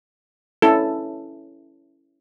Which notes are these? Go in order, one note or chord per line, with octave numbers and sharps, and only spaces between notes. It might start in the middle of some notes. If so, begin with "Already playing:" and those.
C#4 E4 A4